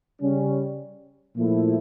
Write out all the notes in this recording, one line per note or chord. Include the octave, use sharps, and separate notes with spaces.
C#3 G3 C#4
A#2 F3 A3 E4